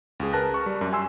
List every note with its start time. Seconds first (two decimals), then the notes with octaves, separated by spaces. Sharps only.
0.20 C#2 G#4
0.33 A#4 B4 A5 F#6 A#6
0.54 C#6
0.66 G3
0.81 F#2
0.93 G#5 C6 E6